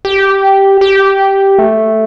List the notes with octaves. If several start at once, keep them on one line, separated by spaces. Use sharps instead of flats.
G4
G4
A3